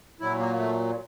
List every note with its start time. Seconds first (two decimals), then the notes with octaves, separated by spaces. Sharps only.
0.20 A#2 F#3 E4
0.39 A#3
0.58 A3